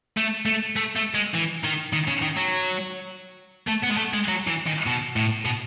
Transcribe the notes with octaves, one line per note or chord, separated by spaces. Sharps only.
A3
A3
A3
A3
G#3
E3
D#3
D#3
C#3
D#3
F#3
A3
B3
G#3
A3
G#3
F#3
E3
D#3
B2
A2
B2